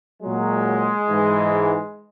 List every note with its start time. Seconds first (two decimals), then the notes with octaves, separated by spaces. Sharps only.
0.22 A#2 F#3 G#3
1.09 G#2 E3